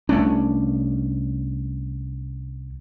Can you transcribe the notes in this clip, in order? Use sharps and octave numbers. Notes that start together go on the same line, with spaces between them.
C2 A3 C#4 D4